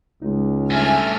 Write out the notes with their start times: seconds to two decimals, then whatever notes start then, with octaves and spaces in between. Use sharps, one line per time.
0.22 C#2 G#3 D#4
0.70 G2 A3 E5 G#5 F6